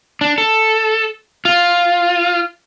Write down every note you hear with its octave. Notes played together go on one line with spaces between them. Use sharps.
D4
A4
F4